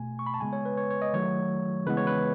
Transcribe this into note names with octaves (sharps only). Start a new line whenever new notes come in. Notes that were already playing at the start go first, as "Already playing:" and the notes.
Already playing: B2 A3 G#5
C#6
B5
A5
C#3 G#3 B3 G#5
C#5
B4
C#5
C#5
D#5
D#3 F#3 A3 C#5
C#3 E3 G#3 B3 B4
C#5
B4